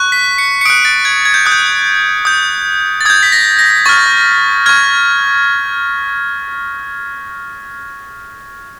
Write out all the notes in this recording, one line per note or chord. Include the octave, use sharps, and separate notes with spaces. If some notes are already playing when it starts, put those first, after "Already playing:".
Already playing: C#6 F#6
B6
C#7
C#7
D#6 F#6 D7
A6
G#6
G#6
G6
D#6 F#6
G6
D#6 G6
A6
D#6 G6 G#6
B6
A#6
A#6
C#6 F6 A6
C#6 F6 G#6